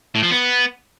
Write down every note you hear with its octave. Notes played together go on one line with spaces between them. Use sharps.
A2
F3
B3